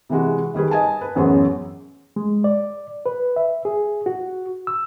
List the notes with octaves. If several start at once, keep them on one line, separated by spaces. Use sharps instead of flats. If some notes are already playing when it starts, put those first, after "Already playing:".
C3 E3 G#3 F#4
D#3 G3 G#4 B4
D#5 G#5 A5
B4
A1 F#2 B3 G#4 C#5
G#3
D5
B4
E5
G#4
F#4
E6